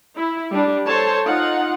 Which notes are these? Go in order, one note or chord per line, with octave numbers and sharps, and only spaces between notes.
E4
G3 D4
A4 C5 C#5 A5
D#4 F4 F#5